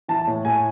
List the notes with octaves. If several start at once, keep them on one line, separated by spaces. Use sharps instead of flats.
E3 A5
A2
A2 G#5